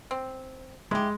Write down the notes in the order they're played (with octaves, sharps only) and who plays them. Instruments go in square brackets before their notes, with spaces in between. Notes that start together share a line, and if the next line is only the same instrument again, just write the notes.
[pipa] C4
[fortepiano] G#3 [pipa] E4 G4